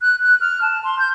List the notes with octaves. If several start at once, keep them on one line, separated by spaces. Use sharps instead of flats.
F#6
F#6
F6
A5
C6
G6